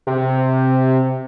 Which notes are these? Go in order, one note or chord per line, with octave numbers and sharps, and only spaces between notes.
C3